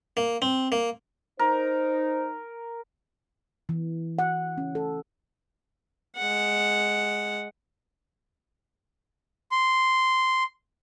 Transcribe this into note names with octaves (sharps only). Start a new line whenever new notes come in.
A#3
C4
A#3
D#4 A#4 C5
E3
F#5
C#4
A4
G#3 F#5
C6